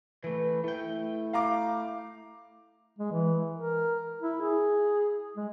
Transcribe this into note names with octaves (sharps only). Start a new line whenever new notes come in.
E3 A3 B4
A3 E4 G5
F5 A#5 D6
G#3
E3
A#4
E4
G#4
G#3